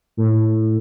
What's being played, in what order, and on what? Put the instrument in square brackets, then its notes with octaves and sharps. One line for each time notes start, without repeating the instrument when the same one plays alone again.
[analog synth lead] A2